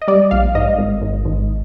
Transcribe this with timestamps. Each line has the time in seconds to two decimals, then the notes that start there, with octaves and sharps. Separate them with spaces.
0.02 D#5
0.08 G3 D5
0.31 A#1 F5
0.55 G#2 D#5
0.78 G#1
1.02 G#1
1.25 G#1